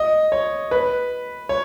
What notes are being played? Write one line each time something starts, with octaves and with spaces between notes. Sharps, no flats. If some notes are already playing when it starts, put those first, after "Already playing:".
Already playing: D#5
C#5
B4
C#5